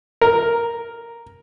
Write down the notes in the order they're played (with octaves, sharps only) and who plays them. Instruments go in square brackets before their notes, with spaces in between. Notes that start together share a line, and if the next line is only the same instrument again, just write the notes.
[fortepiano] A#4